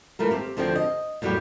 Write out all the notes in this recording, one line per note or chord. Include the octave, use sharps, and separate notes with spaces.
E3 A3 F4 A#4
C4 G4
D2 D3 F3 C4 A#4 G5
D#5
E2 A2 F#3 G3 G4 G5